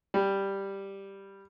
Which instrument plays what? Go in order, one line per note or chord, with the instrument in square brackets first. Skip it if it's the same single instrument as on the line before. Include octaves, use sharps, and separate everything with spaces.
[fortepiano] G3